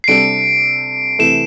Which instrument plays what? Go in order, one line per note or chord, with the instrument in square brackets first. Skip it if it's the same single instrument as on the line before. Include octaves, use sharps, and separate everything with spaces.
[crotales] C7
[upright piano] C3 G3 D4 A4 [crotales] D7
[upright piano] C3 E3 A3 [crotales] E7